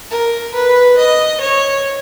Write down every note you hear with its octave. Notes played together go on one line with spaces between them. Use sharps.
A#4
B4
D#5
C#5